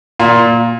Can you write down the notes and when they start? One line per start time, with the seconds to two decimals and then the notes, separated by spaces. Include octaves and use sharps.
0.20 A#2